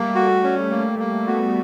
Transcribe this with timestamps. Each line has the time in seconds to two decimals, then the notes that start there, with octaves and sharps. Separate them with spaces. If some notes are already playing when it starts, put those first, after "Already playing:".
Already playing: G3 A3 A#3
0.15 F#4
0.43 C#4
0.71 A#3
0.99 A#3
1.27 A3 B3 F#4